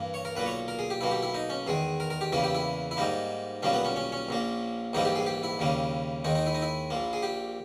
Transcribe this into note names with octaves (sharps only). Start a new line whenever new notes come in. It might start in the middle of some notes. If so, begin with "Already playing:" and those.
Already playing: G2 E3 A#3
C#5
A#4
B1 A#2 A#3 B4
C#5
A#4
G#4
G4
B1 B2 A#3 E4
G4
E4
D#4
C#4
E2 D#3 G#3 G#4
A#4
A#4
G4
E2 C#3 E3 A#3 E4
G4
E4
E4
G#2 G3 A#3 D#4
B1 A#2 G3 A#3 C#4
B3
C#4
C#4
C#4
A#1 A#2 A#3
A#1 G#2 E3 G3 A#3 D#4
G4
G#4
G4
E4
D#2 C#3 G3 A#3
D#2 D#3 G#3 D#4
D#4
E4
D#4
E4
A#1 A#2 A#3
G#4
G4